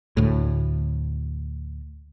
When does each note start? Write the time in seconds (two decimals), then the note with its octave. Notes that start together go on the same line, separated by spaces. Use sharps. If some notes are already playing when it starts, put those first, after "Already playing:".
0.17 D2 A2